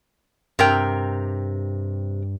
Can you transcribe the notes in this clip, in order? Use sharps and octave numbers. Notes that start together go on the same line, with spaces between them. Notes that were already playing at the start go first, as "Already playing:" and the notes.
G2 C3 A#4 G5